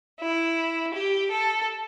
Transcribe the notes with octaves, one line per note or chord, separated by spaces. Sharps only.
E4
G4
A4